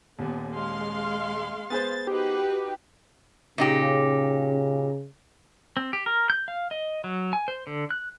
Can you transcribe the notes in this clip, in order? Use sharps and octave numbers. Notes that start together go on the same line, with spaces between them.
D#1 D#2 B3
G#3 F5 C6
B3 G#4 C5 A6
D#4 F#4 G4 B4
A#2 C#3 D#4 G4
C4
G4
A#4
G6
F5
D#5
F#3
G#5
C5
D3
F#6